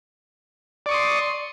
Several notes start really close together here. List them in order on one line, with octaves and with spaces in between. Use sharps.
D5 C#6 D#6 C6